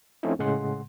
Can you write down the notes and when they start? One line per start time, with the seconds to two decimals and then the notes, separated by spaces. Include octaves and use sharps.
0.23 F3 A3 C4 C#4 D#4 E4
0.39 A2 C#3 G#3 F#5 C6